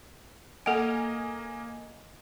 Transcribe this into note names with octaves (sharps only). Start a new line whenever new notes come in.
A#3 A4 D#5 F#5 G#5